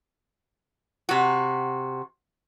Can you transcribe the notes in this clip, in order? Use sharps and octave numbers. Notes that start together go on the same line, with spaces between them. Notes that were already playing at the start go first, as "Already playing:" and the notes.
C3 F#4